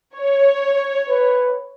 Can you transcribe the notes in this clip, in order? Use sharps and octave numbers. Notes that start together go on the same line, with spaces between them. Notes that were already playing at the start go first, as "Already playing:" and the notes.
C#5
B4